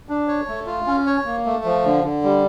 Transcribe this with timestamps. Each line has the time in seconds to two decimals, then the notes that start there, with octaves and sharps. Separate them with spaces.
0.09 D4
0.28 C#5
0.48 A3
0.66 F4
0.87 C#4
1.07 C#5
1.25 A#3
1.46 A3
1.64 F3
1.84 D3
2.04 D3
2.23 G3